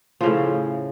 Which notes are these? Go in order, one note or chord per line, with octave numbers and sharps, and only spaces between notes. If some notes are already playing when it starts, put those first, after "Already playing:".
A2 C#3 F3